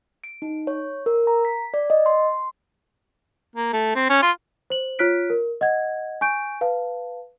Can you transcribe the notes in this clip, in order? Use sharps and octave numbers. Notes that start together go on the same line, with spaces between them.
D7
D#4
C#5
A#4
A#5
B6
D5
D#5
C6
A#3
A3
C4
C#4
F4
C5 F#7
F4 C#5 F6 F#6 B6 D7
A#4
D#5 F#5 G#6
G#5 C#6 G6 D7
B4 F5 A5